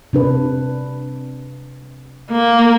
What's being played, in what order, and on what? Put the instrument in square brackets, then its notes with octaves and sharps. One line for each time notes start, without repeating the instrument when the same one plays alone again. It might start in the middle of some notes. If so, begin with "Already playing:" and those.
[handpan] C3 D4 B4
[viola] A#3